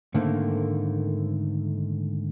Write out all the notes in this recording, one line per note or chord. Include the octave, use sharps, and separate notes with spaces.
G#2 D3 D#3 A3 A#3 C4